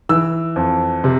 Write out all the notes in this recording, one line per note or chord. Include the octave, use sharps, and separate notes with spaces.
E3 E6
F2
C3